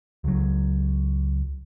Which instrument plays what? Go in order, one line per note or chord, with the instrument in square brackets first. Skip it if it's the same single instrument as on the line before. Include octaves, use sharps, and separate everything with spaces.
[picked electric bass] C#2 F#3